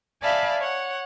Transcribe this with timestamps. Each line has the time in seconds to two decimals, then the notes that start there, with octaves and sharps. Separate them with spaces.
0.23 D5 E5 F5 G#5 A5 B5
0.60 C#5 F#5